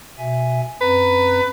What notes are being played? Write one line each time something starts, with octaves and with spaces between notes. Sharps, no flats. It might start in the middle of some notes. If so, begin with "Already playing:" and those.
B2 E5 G#5
F#2 C4 B4 A#5